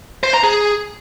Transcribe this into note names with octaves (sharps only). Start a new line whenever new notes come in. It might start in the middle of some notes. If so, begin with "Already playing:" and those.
C5
A#5
G#4